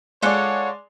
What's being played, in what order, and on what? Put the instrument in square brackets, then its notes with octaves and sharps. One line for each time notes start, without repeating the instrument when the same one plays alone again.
[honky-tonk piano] G#3 D5 [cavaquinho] F4 A4 F#5 [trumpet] C#5